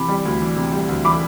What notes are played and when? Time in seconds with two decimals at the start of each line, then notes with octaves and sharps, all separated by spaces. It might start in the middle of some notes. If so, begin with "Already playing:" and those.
Already playing: C3 E3 B5 D6
0.08 G3
0.25 D2
0.41 E3
0.56 C3
0.73 G3
0.89 D2
1.05 E3 B5 D6